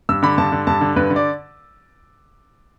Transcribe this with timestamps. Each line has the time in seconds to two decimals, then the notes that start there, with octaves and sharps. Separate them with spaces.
0.09 G2 E6
0.23 D3 B5
0.38 G2 A5
0.52 D3
0.67 G2 A5
0.81 D3
0.96 G2 B4
1.10 D3
1.16 D5